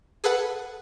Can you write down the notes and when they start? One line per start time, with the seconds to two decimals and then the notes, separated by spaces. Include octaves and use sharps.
0.24 G#4 A4 B4 F#5